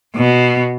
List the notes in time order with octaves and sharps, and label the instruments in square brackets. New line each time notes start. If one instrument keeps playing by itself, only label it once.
[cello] B2